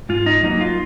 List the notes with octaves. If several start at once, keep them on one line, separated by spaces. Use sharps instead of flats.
G#2 F4
D#4
F#3 A#3 D#4
F4